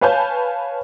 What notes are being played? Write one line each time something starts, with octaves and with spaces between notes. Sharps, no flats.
B4 C#5 F5 G#5 A5 G6